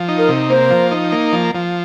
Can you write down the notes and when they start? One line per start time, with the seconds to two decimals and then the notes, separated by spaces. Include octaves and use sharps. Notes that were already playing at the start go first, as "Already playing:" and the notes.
Already playing: F3
0.08 D#4
0.18 A#4
0.28 C3
0.49 A#3 C5
0.70 F3
0.91 D#4
1.12 A#3
1.33 F3
1.55 F3